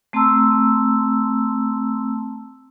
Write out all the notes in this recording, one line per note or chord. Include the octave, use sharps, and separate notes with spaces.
A3 C4 A5 A#5 C6 E6